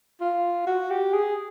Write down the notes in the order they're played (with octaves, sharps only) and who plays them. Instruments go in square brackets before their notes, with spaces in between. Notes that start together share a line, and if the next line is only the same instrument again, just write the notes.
[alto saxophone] F4
F#4
G4
G#4